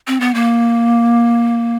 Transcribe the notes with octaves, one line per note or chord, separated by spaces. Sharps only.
C4
B3
A#3